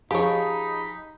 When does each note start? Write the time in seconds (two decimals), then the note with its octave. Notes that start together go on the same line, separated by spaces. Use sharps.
0.11 F3 D#4 G4 G#4 C#5 G#5 B5